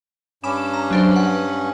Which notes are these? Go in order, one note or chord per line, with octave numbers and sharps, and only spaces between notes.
G2 C#4 B5 D6 E7
A#5
F#3 D4 C5
B4 F#5